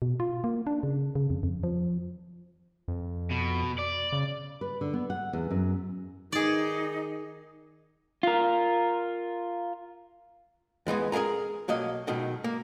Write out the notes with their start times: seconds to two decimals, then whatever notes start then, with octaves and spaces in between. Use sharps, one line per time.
0.02 B2
0.20 F4
0.44 A#3
0.67 D4
0.83 C#3
1.15 C#3
1.30 F2
1.43 F2
1.63 F3
2.88 F2
3.30 B2
3.78 D5
4.12 C#3
4.61 B4
4.81 D3
4.93 B3
5.10 F#5
5.33 E2
5.50 F#2
6.32 D#3 D#4 G#4 D5
8.23 F4 A#4
10.86 D#2 E3 G#3 B3
11.12 G#4 A#4 F5 G#5 A#5
11.68 B1 F#3 A#3 D#5
12.07 G#2 B2 D#3 F#3
12.44 A#3